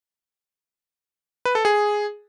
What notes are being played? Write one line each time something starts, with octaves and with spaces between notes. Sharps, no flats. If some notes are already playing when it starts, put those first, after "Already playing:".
B4
A4
G#4